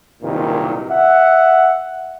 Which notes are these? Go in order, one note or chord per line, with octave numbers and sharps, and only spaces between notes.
F#1 C2 G2 A#2 D#3
E5 F#5